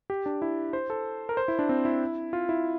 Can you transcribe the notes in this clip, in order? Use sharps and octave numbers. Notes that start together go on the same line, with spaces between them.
G4
D4
E4
C5
A4
A#4
C5
E4
D4
C4
E4
F4
E4